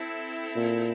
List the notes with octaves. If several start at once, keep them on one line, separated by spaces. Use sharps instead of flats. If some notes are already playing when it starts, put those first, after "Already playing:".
Already playing: C4 E4 A4
A#2